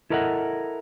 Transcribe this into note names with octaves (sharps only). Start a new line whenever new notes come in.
E4 A4 A#4 D#5 E5 F#5